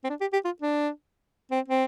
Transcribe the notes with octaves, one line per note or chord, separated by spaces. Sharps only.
C4
D4
G4
G4
F4
D4
C4
C4